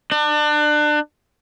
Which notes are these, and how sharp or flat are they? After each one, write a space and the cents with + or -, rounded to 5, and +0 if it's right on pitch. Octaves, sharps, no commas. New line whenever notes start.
D4 +30